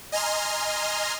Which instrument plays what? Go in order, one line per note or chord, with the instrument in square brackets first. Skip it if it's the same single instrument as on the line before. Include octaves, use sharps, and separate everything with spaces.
[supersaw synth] D#5 G#5 A#5 C6 F6